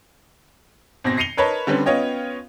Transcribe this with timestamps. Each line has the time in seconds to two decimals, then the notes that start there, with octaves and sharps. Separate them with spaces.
1.04 G#1 B2 C4 A#6
1.17 A#6 C7 C#7 D#7 F7 G7
1.37 A#4 B4 C#5 D#5 A5 B5
1.67 D3 G3 C4 C#4 B4
1.86 B3 C#4 F4 C#5 D#5 G5